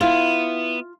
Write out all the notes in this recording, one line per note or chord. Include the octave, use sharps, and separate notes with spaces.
B3 E4 F4